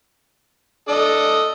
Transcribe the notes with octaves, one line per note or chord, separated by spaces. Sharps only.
D4 A4 D#5